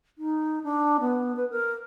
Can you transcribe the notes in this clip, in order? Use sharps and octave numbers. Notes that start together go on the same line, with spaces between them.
D#4
D4
B3
B4
A#4